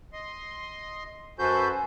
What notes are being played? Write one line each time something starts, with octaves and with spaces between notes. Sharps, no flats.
D#5 C6
F#2 F#4 A4 B4 C5 G#5 G6